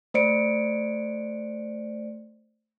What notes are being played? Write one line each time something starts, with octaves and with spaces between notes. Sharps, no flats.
A3 C5 D5 C#7 D7